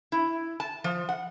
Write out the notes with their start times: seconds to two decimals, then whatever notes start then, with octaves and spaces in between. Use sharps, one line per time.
0.12 E4
0.60 A5
0.84 F3
1.09 F#5